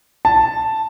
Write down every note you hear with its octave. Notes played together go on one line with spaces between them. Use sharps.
A5